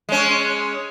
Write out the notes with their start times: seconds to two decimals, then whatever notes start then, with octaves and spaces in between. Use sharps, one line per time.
0.09 G#3 C#4